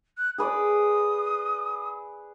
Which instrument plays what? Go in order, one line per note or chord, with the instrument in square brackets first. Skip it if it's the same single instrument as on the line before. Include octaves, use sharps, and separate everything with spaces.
[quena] F#6
[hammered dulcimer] G#4 B4 D5 [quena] D#6